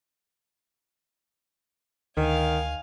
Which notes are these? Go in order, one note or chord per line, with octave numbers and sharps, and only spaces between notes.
D2 D#3 F5 G#5